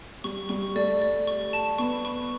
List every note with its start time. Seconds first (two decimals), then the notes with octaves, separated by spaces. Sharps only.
0.24 G3 C#6
0.49 G3 C#6
0.75 A3 D5
1.02 D5
1.27 C#6
1.53 A5
1.78 B3 C#6
2.05 C#6